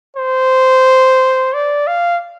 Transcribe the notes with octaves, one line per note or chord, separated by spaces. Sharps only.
C5
D5
F5